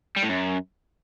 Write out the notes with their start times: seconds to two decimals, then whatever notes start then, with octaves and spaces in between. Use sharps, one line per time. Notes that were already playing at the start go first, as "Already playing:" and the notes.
0.17 G3
0.23 A2
0.29 F#2